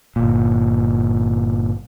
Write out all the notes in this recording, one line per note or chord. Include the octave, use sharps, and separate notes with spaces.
G1 A#2